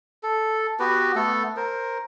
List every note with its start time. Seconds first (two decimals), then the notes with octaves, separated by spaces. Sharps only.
0.23 A4
0.79 B3 F#4 G4 B4
1.15 A3 B3 A4
1.56 A#4 C5